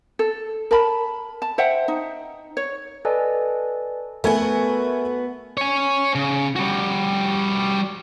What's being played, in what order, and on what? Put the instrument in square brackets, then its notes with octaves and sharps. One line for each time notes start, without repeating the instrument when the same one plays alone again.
[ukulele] A4
A#4 A5 B5
A5
C5 E5 F#5 G5
D#4
C#5
[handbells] A4 B4 D5 D#5 G#5 A5
[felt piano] A3 A#4 G#5 [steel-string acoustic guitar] B3 F#4
[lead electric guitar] C#5 G#5
C#3
G3 F#4